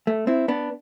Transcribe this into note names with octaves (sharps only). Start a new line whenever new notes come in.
A3
C4 E4
B3 D4